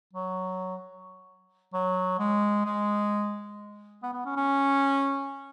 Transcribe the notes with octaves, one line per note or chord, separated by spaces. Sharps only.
F#3
F#3
G#3
G#3
B3
B3
C#4
C#4